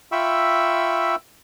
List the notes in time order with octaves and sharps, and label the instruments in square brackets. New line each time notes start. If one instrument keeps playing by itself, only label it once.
[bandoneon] F4 E5 G5 B5 C#6 E6